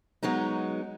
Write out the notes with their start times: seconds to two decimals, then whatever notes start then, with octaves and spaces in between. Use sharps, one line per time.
0.23 F#3 G#3 B3 C#4 D#4